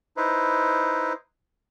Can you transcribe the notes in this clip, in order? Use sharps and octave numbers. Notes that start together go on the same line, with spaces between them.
D#4 E4 B4 C5